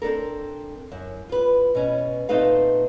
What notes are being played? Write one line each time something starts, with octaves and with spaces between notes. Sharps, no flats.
C4 D4 A4 A#4
F#2
F4 B4
B2 C#4
A#2 A3 C4 D#4 B4 F5